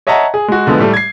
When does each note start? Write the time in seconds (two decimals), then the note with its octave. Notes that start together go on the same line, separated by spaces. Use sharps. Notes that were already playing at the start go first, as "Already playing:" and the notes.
0.07 C#5 D#5 E5 F#5 A5 A#5
0.34 G#4
0.48 G#3 F#4
0.67 D3 F3 G#3 B3
0.79 A2 G3 A3
0.94 G#6 C7